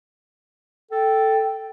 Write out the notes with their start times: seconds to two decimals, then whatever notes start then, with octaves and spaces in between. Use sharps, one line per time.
0.91 A4 G5